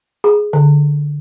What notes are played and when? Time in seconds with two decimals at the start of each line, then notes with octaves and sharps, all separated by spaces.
0.24 G#4
0.53 D3